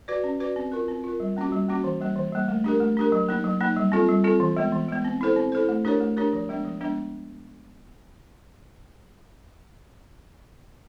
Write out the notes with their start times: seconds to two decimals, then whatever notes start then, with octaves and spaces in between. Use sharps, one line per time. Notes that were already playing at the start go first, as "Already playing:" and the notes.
0.08 F#4 B4 D5
0.24 C#4
0.40 F#4 B4 D5
0.56 C4
0.72 F4 A#4
0.88 C4
1.04 F4 A#4
1.20 G3
1.37 A#3 C#4 F#4
1.52 G3
1.69 A#3 C#4 F#4
1.84 E3
2.00 G3 A#3
2.16 E3
2.32 G3 A#3
2.48 A3
2.64 D4 G4 A#4
2.80 A3
2.97 D4 G4 A#4
3.12 F#3
3.29 A#3 D#4
3.44 F#3
3.61 A#3 D#4
3.77 G3
3.92 C4 F4 A4
4.09 G3
4.24 C4 F4 A4
4.40 E3
4.57 G#3 B3
4.72 E3
4.89 G#3 B3
5.05 C4
5.21 E4 A4 C5
5.36 C4
5.52 E4 A4 C5
5.69 A3
5.85 D4 G4 A#4 C#5
6.00 A3
6.17 D4 G4 A#4 C#5
6.33 F3
6.49 G#3 B3 D4
6.65 F3
6.81 G#3 B3 D4